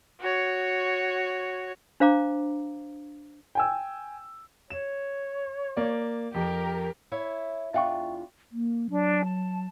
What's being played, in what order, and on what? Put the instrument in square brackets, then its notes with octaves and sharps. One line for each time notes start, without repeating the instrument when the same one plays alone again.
[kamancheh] F#4 C#5
[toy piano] D4 C5 F5 A#5 D6
[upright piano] G5 G#5 E6
[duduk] C#5 [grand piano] E7
[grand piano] A#3 D5
[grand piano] F2 [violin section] G4 A#4
[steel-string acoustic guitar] E4 C#5 E5
[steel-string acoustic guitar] E2 D4 F4 [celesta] E5 G5 C#6
[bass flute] A#3
[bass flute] F#3 [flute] D4
[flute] A5